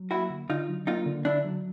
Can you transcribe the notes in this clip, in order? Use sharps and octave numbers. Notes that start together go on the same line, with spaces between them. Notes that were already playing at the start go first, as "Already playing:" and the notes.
Already playing: F#3
A#3 E4 F#4
D3
D3 D#4 F4
F#3
A#3 D#4 F4
D3
D3 D4 E4
F#3